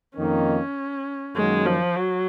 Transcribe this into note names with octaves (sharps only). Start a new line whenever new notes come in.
F2 D#3 A#3 C#4 D#4
F#2 D#3 F#3 G#3 A#3
F3
F#3